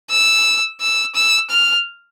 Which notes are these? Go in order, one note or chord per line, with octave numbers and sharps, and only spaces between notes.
E6
E6
E6
F6